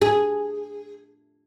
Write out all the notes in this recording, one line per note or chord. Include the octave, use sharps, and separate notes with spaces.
G#4